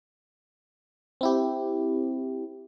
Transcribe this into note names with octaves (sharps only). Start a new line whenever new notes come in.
C4 E4 G4